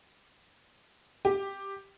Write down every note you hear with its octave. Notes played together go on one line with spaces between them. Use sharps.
G4